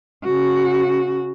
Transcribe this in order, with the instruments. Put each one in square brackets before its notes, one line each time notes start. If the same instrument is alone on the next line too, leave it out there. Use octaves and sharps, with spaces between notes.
[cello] C#3 F#4